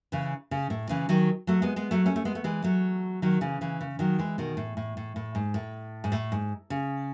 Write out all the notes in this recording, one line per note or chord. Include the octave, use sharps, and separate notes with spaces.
C#3 E3
C#3
A2
C#3 E3
D#3 F#3
F#3 A3
G#3 B3
G#3 B3
F#3 A3
A3 C#4
A3
G#3 B3
A3
E3 G#3
F#3 A3
D#3 F#3
C#3 E3
C#3 E3
C#3
D#3 F#3
E3 G#3
B2 D#3
A2
A2
A2
A2
G#2
A2
G#2
A2
G#2
C#3